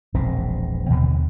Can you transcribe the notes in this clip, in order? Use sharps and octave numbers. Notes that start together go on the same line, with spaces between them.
E1 A#1 G#2 C4
D#2 B2 D3